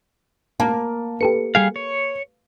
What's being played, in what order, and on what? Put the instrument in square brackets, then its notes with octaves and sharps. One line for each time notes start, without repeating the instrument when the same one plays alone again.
[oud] A#3 [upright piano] A5
[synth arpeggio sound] G4 A4 C#7 [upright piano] B4
[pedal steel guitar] G3 G#4 F5
C#5